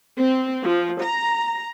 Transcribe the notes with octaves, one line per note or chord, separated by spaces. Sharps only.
C4
F3
A#5